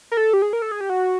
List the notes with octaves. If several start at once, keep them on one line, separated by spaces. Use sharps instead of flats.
A#4
A4
G4
G#4
A#4
A4
G#4
G4
F#4